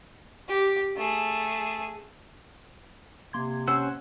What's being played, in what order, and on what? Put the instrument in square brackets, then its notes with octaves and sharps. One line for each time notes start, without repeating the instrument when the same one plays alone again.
[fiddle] G4
A3 G#4
[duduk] C3 [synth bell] A#3 C6 G#6
[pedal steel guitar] C#4 C5 F#5 [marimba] E6